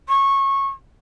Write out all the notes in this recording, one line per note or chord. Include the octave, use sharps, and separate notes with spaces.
C#6